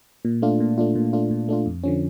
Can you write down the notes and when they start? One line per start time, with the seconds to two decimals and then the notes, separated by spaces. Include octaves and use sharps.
0.25 A#2
0.42 A3 D4 F4
0.60 A#2
0.78 A3 D4 F4
0.95 A#2
1.13 A3 D4 F4
1.31 A#2
1.48 A3 D4 F4
1.66 F2
1.83 D3 F3 C#4